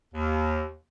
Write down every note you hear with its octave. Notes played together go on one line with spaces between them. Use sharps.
D#2